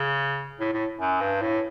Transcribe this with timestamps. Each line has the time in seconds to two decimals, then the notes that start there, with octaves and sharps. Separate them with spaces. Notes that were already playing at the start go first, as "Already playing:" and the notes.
Already playing: C#3
0.60 A2
0.73 A2
1.00 F#2
1.21 G2
1.42 A2